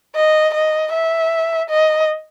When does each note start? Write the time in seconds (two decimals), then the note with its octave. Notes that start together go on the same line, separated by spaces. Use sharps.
0.16 D#5
0.55 D#5
0.93 E5
1.70 D#5